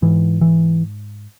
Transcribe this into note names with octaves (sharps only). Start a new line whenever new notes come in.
G#2 E3
E3